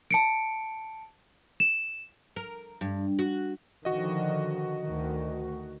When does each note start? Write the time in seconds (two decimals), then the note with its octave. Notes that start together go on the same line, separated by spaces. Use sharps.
0.11 A5 C#7 D7
1.60 E7
2.36 A#4
2.81 G2
3.19 F#4
3.85 D3 D#3 F3 F#4 D#5
4.82 D2 D#3